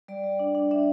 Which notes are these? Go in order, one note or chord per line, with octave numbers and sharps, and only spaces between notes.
G3 D5
G3
D4
D4
D4 E5